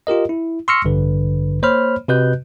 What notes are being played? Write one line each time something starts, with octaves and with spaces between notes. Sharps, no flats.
F4 G4 A#4 D#5
E4
C6 C#6 E6 F6 A#6 C#7
A1 G2 D3 B4
A#3 C5 C#5 B5 F6
C3 F#4 B4 D#5 F#6 G6